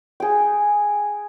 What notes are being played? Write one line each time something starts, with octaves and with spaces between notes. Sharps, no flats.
G#4 G5